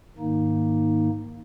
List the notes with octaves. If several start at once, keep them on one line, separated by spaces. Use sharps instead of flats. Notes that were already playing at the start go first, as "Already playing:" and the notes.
G#2 D#3 A#3 D#4